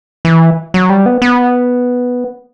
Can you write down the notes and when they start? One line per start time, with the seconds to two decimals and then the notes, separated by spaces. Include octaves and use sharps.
0.25 E3
0.74 F#3
0.90 G3
1.06 B3
1.22 B3